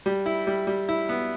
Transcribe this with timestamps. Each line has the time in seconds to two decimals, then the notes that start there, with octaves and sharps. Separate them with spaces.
0.06 G3
0.26 E4
0.47 G3
0.67 G3
0.89 E4
1.09 B3